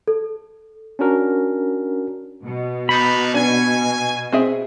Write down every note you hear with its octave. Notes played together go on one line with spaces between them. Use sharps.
A4
C#4 D4 F#4 A#4
B2
A#3 D4 D#4 B5
D4 G#5
C4 G#4 E5